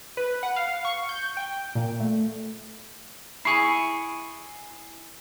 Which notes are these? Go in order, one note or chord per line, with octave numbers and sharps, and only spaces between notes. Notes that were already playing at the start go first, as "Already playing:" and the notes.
B4
F#5
F5
C#6
G6
G5
A#2
A3
E4 G#4 B5 C#6 C7 C#7